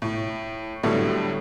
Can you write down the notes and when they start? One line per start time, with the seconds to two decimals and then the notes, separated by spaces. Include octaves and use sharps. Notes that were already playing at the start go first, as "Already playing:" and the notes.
0.02 A2
0.83 A2 D3 F#3 G3 A3 B3